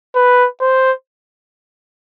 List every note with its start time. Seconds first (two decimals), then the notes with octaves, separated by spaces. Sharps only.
0.15 B4
0.61 C5